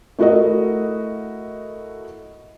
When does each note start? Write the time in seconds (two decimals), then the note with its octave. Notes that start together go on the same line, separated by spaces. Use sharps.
0.19 A3 E4 F#4 A#4 D#5